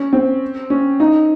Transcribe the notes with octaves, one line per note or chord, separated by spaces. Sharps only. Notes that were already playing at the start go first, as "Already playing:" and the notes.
Already playing: C#4
C4
C#4
D#4